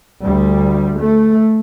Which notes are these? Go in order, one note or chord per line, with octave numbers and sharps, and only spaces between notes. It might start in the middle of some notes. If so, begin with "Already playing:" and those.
D2 G3
A3